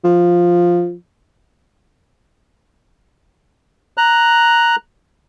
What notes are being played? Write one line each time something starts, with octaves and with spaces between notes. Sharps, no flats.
F3
A#5 F#6